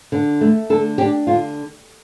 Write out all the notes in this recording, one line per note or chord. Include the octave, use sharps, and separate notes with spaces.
D3
A3
D3 A4
D4 G4
D3 F4